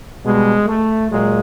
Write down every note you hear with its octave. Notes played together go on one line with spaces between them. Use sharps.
B2 G3 G#3
A3
A#2 F#3 G#3